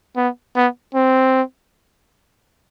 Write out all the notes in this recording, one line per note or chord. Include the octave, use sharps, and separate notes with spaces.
B3
B3
C4